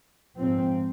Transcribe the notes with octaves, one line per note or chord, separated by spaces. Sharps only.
G#2 F3 C4